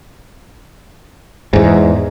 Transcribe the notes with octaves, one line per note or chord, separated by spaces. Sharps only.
E2 G#2